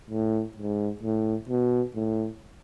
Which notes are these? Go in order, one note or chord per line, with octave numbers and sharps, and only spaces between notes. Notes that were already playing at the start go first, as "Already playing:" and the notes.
A2
G#2
A2
B2
A2